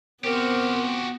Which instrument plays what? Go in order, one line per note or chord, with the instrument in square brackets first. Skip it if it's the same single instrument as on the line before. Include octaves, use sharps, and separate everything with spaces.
[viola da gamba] B3 [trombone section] C4 C5 [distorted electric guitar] F#4 G4 [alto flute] A#4